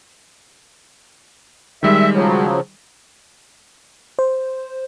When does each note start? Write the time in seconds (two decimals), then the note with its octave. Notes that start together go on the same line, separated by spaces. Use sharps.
1.83 D#3 G3 G#3 E5
2.15 C#3 F3 F#3
4.19 C5